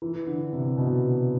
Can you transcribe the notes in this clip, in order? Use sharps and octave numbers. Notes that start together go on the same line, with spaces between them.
E3
D3
C3
B2